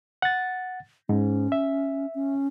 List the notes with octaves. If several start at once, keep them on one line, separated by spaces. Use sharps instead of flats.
F#5 A6
G#2 C#4
E5
C#4